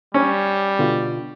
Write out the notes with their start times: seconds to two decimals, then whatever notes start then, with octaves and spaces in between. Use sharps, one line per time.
0.14 G3 C#4
0.79 B2 D3 F4